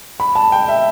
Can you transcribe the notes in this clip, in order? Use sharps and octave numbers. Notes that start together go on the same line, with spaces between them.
B5
A5
G5
E5